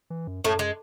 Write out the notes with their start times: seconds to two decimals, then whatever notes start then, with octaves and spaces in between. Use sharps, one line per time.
0.10 E3
0.27 F#2
0.44 F#2 A2 A3
0.59 G#3